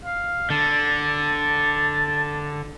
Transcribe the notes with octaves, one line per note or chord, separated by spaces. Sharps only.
F5
D3 A5